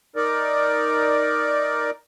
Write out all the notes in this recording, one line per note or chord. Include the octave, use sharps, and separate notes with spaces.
D#4 A#4 D5